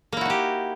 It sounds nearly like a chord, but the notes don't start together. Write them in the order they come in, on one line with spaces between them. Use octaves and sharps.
A#3 E4 F#4 D#4 G4